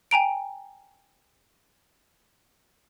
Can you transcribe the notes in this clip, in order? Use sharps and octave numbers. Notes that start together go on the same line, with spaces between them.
G5 G#5 A#5 D7